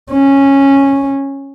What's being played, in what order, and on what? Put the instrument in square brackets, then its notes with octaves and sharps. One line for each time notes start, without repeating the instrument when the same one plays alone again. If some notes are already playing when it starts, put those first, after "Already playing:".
[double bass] C#4